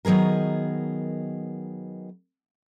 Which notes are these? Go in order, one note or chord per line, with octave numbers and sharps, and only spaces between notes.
D#3 F#3 B3 G#4 A#4